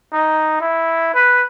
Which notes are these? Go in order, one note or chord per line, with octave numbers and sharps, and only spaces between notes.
D#4
E4
B4